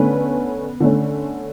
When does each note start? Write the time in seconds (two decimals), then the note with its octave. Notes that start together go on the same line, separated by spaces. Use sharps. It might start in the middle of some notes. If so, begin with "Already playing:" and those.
Already playing: D3 A3 B3 C#4 B4
0.80 D3 A3 C#4